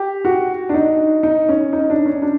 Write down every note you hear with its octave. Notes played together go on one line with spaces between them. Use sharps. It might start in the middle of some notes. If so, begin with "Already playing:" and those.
Already playing: G4
F#4
D4
D#4
D#4
C#4
D#4
D4
C#4
D4